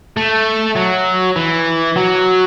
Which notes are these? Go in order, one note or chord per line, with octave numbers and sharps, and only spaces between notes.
A3
F#3
E3
F#3